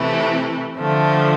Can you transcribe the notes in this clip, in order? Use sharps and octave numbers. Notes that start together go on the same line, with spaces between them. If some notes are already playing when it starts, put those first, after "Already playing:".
Already playing: C3 E3 A3 E4
D3 F3 A3